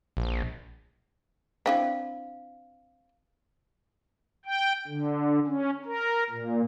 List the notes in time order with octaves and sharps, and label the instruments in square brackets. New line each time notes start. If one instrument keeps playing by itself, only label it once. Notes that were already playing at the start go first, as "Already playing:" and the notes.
[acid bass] A#1
[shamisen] C4 D4 E4 [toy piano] F5
[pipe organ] G5
D3
C#4
A#4
A#2